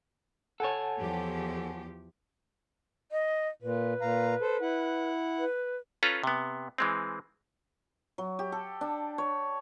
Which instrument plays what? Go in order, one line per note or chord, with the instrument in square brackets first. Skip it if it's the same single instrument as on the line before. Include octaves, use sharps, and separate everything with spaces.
[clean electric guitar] A4 C#5 [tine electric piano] F#5 G#5 A5
[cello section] E2 F3 G4
[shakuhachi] D#5
[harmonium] A#2 [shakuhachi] B4
[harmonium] A#2 F5 A#5
A4 C5
E4 F#5
[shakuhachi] B4
[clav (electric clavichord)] C#4 F4 A4 B4 A#5
C3 B3
E3 G#3 C4
[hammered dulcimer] F#3
G4
A4
D4
C#5